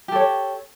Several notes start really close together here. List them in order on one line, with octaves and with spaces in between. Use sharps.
G4 A4 C#5